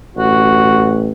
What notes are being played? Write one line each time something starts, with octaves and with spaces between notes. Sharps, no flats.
A1 F#4